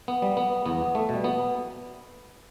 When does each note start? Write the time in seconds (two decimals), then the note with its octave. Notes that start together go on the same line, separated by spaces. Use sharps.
0.08 B3
0.22 G3
0.37 B3
0.66 E2 B3
0.95 A3
1.09 B2 G3
1.24 B3